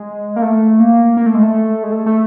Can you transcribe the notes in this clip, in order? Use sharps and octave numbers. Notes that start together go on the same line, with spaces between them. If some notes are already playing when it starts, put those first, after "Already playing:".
Already playing: G#3
A#3
A3
A#3
A#3
A3
G#3
A3
G#3
A3
A3